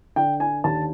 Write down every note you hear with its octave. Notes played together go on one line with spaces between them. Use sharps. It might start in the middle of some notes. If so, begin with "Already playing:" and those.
D3 G5
G#5
D#2 A5